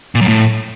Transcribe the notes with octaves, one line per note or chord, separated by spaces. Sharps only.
A#2
F#2
A2